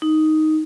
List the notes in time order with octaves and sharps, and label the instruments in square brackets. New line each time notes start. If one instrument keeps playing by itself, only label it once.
[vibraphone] D#4